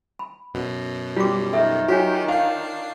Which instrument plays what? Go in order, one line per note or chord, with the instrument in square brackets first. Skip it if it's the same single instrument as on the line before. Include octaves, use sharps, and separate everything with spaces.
[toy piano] B5
[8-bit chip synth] F#2 B2
[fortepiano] G3 [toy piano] F4 F#4 D6
[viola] D#3 [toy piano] A4 E5
[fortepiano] F#3 [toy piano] F4 C#5 G#5 [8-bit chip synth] G4
[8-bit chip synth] D4 C7 [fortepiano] F5